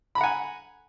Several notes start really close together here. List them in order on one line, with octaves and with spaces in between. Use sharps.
B5 A#5 F#5 G#5